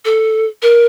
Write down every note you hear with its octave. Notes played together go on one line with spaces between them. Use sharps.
A4
A#4